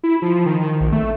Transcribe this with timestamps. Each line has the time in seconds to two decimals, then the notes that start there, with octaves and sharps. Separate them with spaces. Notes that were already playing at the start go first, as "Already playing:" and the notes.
0.03 E4
0.22 F3
0.46 D#3
0.81 A#1
0.92 A3